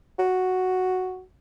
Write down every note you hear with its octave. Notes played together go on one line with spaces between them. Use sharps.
F#4